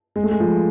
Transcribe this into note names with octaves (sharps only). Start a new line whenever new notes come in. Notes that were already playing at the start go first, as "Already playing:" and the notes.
G#3
A3
G#3
F3